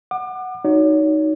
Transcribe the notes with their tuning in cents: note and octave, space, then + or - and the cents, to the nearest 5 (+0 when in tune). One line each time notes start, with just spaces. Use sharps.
F#5 +0 D6 +35
D#4 +0 F#4 +0 C#5 +35